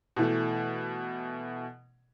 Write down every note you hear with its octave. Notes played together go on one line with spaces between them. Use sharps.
B2 E3 A3